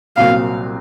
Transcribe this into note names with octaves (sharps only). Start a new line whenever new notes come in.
C2 A#2 F#3 C4 F#4 F5